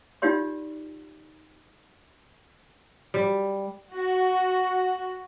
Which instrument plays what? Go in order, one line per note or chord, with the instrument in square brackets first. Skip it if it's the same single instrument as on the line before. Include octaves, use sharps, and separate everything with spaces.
[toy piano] D#4 F4 G4 D5 C6
[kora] G3
[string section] F#4